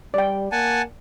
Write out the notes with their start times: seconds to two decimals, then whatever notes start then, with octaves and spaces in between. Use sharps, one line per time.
0.14 G3 D5 G5
0.52 A#3 F#5 G#5 A5